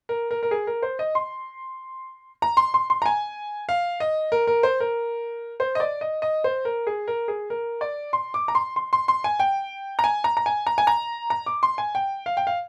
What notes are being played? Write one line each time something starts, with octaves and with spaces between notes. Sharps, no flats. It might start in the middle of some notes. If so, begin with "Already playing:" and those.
A#4
A#4
A#4
G#4
A#4
C5
D#5
C6
A#5
C6
C6
C6
A#5
G#5
F5
D#5
A#4
A#4
C5
A#4
C5
D#5
D5
D#5
D#5
C5
A#4
G#4
A#4
G#4
A#4
D5
C6
D6
A#5
C6
C6
C6
C6
G#5
G5
A#5
G#5
A#5
A#5
G#5
A#5
G#5
A#5
A#5
D6
C6
G#5
G5
F5
G5
F5